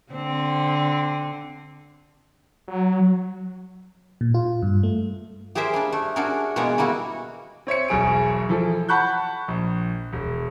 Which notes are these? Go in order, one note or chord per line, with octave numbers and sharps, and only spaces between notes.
D3 C4
F#3
A#2
F4
G2
A3
G4 G#4 A#4 C5 E5
G3 A#3 D4
A3
D4 F#4 G#4 A#4
B2 E3 G#3 A#3 C#5 A#5
G3 A#3 E4 F#4
C4 C#5 E5 C#7
E1 B1 G#4 D7
E3 F3 A4
F#5 A5 B5 C#6 F#6 G6
A#1
E1